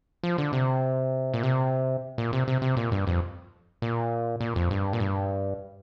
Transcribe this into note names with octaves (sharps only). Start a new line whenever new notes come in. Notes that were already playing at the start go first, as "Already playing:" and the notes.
F3
D3
C3
A#2
C3
A#2
C3
C3
C3
A#2
G2
F2
A#2
A#2
F2
G2
A#2
G2